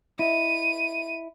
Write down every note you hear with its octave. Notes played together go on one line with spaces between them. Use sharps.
E4 D#5 E5 D#7